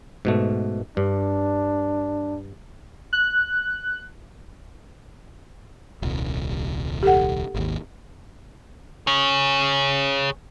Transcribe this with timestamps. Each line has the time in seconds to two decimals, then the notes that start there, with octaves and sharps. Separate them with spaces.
0.25 G#2 B2 A3
0.97 G2 D4
3.13 F#6
6.02 D#1 C2
7.03 G4 A4 F#5
7.54 G#1 D#2
9.07 G#4 C#5